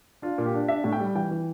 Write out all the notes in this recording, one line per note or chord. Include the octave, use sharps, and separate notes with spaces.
D4 F4
A#2
G4
D4
D4 E5
A2
G5
G3
E3 G5
E3